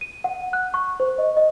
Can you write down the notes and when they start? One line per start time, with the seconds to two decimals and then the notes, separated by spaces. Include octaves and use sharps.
0.01 D#7
0.24 F#5
0.53 F#6
0.74 C#6
1.00 C5
1.18 D#5
1.37 D#5